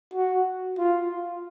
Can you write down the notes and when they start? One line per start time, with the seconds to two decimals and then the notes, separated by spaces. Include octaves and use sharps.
0.14 F#4
0.78 F4